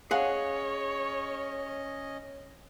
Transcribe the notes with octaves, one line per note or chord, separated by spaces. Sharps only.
C#4 G#4 C#5 D#5 F5 F#5